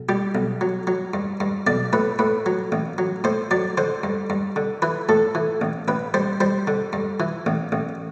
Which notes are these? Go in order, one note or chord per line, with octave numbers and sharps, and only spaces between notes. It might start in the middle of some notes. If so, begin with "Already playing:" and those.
Already playing: B1
G3 G4
B1
F#3
F#3
G2
G2
B1 D5
A2 B4
A2 B4
F#3
A1
F#3
A2 C5
F#3 D5
D3 C5
G2
G2
D3
E3 B4
A2 A4
E3
A1
A1 B4
G3 C5
G3 C5
D3
G2
E3
A1
A1